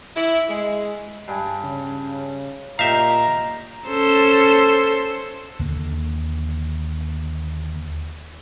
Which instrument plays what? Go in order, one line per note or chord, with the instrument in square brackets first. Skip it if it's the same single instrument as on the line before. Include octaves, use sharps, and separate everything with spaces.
[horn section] E4
G#3
[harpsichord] G2 G#5
[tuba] C#3
[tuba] A#2 [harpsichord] D#4 G4 [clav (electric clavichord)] E5 F5 [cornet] A#5
[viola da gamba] C#4 A4 C5
[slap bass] D#2 D3 A#3